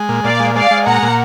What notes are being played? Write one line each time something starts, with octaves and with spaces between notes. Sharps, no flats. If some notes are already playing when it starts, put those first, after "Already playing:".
Already playing: G#3
A#2
A#2 D5 F5
G#3
G#3 D5 F5
G#3
A#2 F#5 A#5
A#2